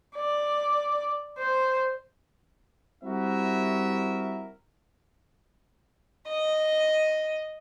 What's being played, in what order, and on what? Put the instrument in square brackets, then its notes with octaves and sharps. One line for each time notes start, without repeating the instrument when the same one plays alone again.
[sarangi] D5
C5
[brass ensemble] G3 C4 E4 F#4 A#4 E5
[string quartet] D#5